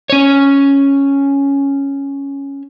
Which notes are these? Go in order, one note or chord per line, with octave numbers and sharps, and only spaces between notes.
C#4 C#5